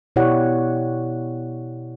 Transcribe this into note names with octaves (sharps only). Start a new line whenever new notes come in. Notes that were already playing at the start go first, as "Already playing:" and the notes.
B2 E4 G4 C#5 D5 F#5